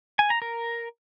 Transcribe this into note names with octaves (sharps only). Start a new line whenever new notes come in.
G#5
A#5
A#4